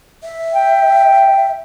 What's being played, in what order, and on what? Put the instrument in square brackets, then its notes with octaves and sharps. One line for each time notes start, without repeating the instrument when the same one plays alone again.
[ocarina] E5
[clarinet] G5